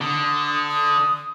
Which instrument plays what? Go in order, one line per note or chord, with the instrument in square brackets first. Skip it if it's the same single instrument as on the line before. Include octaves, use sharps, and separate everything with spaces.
[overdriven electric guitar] D3 [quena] D#6
[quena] D#6